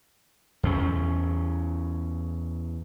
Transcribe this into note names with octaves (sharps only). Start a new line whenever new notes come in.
E2 C#4